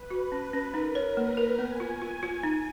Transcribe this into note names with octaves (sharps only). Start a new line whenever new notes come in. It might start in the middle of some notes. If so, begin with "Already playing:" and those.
Already playing: B4
F#4
C#4
C#4
D#4 A#4
C#5
A#3 B4
A#4
B3 G#5
F4
F4
F4
D#4